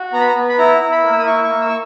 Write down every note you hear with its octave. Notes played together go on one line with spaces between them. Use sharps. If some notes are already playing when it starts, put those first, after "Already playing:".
Already playing: F#4
B3 A#5
B5
A#5
B3
B5
E4 A#5
E4
B5
A#3
E6
D#6
E4 C#6
C#6
A#3
E6
C#6